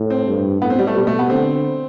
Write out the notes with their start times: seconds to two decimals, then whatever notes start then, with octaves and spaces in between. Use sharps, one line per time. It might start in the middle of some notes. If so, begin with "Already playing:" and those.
Already playing: A2
0.10 C4
0.27 G2
0.62 A2 B3
0.70 C4
0.79 G3
0.87 A3
0.96 B2 G3
1.07 A3
1.19 B3
1.30 D3 C4